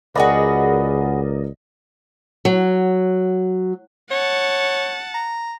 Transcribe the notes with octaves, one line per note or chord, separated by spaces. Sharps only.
C#2 F#4 G#4 A#4 B4 D5 D#5
F#3
C#5 F#5 A5
A#5